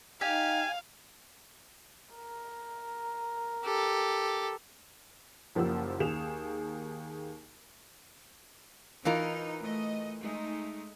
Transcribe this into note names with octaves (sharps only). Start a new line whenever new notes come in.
D#4 G4 F5 G#5
A#4
G4 A4
F#1 F3 A#3 G4 F#5 E6
D#2 G#4 E7 F7
E3 D#4 F4 A#4
A3 D#5
G#3 A3 D#4